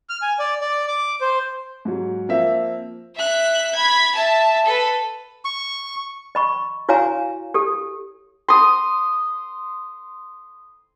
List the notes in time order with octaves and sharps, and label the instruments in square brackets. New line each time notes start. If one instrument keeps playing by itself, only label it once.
[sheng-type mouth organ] F6
G#5
D5
D5
D6
C5
[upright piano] G#2 F#3
F3 A#3 C4 E5 F5
[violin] E5 F#6
B5 G#6
E5 A5
A4 B4
[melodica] C#6
[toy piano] D#5 B5 C#6
E4 F#4 C#5 F5 G#5 A#5
G4 A4
[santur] C6 D#6